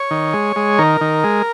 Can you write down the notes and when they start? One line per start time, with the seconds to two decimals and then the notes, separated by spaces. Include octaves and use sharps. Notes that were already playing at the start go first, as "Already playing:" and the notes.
Already playing: C#5
0.11 D#3
0.34 G#3
0.56 G#3
0.79 D#3 A#4
1.01 D#3
1.24 G#3